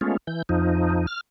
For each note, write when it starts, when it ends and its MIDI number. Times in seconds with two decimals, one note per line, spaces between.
0.01 0.17 56
0.01 0.17 57
0.01 0.17 59
0.01 0.17 61
0.01 0.17 65
0.27 0.42 52
0.27 0.42 91
0.49 1.06 41
0.49 1.06 53
0.49 1.06 63
1.07 1.21 89